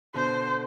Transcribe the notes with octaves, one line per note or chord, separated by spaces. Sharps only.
B2 D3 C5